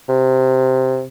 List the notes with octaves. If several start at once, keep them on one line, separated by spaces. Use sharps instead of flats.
C3